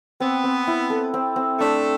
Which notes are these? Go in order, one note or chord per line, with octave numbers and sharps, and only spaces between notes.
B3 C4
C4
E4
A4
C4
C4
A3 D4